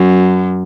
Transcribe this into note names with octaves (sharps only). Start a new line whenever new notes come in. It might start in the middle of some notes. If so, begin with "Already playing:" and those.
Already playing: F#2